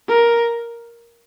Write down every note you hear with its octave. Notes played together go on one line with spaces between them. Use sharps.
A#4